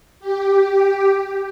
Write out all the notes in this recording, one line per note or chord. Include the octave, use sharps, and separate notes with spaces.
G4